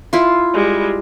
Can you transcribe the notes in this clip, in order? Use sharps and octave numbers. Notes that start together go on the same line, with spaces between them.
E4 F4
G3 G#3